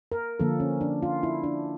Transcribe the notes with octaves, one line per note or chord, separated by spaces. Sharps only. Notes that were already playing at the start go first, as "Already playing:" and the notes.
A#4
D3 F3 A#3 A4
C#4
D4
F4
E4
D4